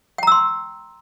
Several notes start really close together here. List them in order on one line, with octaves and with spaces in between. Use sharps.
G5 A#5 E6 C6